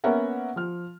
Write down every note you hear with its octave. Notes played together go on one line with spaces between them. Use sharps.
A#3 B3 C#4 A#4 E5 F#5
F3 F6